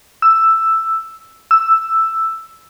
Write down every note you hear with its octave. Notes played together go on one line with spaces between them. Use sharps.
E6
E6